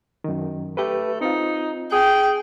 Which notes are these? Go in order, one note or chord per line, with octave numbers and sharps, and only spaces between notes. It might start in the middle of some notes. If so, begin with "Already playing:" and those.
F#2 D#3
A3 G4 B4
C4 D#4 F4
G#4 G5